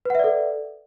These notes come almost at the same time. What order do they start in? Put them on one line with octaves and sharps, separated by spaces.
B4 F#5 E5 D5 A4